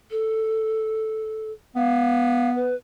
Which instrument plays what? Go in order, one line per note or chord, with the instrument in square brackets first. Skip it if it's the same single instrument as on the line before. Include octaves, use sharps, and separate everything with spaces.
[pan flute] A4
[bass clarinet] B3 [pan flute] F5
[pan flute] B4